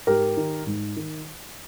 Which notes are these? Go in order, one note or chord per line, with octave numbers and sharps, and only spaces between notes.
G#2 G4 A#4
D#3
G#2
D#3